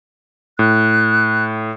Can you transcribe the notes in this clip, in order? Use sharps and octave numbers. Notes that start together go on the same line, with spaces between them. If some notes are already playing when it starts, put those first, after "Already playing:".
A2 F#6